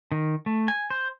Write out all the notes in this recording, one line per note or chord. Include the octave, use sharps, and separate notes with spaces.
D#3
A3
G#5
C5